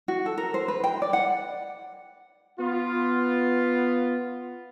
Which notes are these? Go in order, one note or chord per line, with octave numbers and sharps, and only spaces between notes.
F#4
A4
A#4
C5
B4
G5
D5
F#5
B3 F4